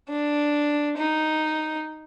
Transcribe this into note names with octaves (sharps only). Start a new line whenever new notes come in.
D4
D#4